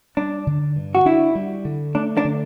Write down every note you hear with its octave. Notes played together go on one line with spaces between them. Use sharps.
G3 D4
D3
G2
F#4
D4 E4
G3
D3
A3 D4
D4
D3